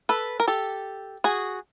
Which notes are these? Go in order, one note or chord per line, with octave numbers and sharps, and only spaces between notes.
A4 B4
A#4
G4 A4
F#4 G#4